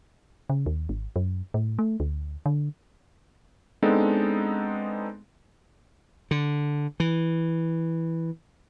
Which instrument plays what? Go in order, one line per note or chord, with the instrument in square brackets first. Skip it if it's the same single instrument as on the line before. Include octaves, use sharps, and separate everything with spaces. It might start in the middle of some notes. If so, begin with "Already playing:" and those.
[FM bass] C#3
D#2
G#1
F#2
A2
A3
D2
D3
[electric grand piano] G#3 B3 C4 D4 D#4 A4
[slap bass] D3
E3